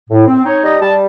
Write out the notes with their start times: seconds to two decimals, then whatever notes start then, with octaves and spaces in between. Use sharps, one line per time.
0.09 A2
0.27 C4
0.44 D#4 C#5
0.63 G3 D#5
0.80 G3 A5